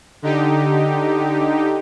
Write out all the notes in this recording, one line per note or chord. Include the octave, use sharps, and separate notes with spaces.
D3 D#4 G4